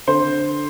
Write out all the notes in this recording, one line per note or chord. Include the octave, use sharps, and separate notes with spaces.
D3 C5